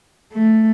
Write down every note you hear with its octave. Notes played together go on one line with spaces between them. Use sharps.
A3